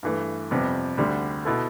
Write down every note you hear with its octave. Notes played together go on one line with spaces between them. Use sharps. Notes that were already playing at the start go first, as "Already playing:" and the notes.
G2 E3 A3
F2 C3 G3 B3
D2 D3 G3 D4
B2 B3 E4 A4